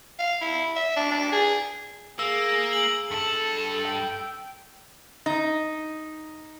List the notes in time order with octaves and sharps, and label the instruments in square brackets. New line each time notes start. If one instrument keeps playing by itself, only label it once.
[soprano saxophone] F5
E4
E5
D4
D4
G#4
[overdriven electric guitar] A#3 [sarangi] G#4 [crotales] E6
[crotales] F#7
[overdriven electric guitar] G2 A5 [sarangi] A4
[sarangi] G5
[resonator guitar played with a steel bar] D#4